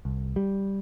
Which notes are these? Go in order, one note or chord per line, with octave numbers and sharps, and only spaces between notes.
C2
G3